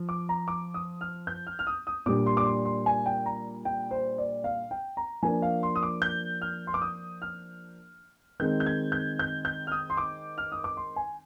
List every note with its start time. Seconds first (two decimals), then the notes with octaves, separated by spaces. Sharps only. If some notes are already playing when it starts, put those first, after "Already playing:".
Already playing: F3
0.09 D6
0.29 A#5
0.48 D6
0.74 D#6
1.01 F6
1.27 G6
1.47 F6
1.59 F6
1.67 D#6
1.87 D#6
2.06 A#2 G3 D4 D6
2.26 C6
2.37 D6
2.45 C6
2.65 C6
2.86 G#5
3.06 G5
3.26 A#5
3.65 G5
3.91 C5
4.18 D5
4.44 F5
4.71 G5
4.97 A#5
5.23 F3 A#3 D4 G#5
5.42 F5
5.63 C6
5.75 D#6
5.83 D6
6.02 G6
6.41 F6
6.67 C6
6.74 D6
6.81 D#6
7.22 F6
8.40 D#3 G#3 C4 D#4 G6
8.60 G6
8.66 G#6
8.92 G6
9.19 G6
9.45 G6
9.67 F6
9.72 D#6
9.90 C6
9.97 D6
10.38 F6
10.52 D#6
10.64 D6
10.77 C6
10.96 G#5